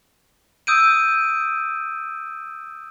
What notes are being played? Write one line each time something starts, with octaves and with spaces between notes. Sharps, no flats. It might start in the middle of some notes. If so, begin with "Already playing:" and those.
D#6 E6 G6 D7 D#7